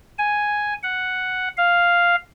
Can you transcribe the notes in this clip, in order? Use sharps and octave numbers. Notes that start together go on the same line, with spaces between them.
G#5
F#5
F5